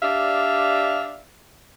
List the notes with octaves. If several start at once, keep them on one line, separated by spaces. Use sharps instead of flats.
D4 G4 D5 E5 F5